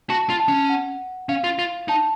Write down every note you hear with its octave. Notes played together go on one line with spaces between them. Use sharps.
F#4 A5
F4
A5
C#4
F#5
C#4 F5
F4
F4
D#4 A5